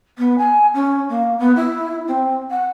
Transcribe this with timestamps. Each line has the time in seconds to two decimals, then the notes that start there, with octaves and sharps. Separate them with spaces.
0.18 B3
0.38 G#5
0.73 C#4
1.09 A#3
1.38 B3
1.56 E4
2.07 C4
2.50 F#5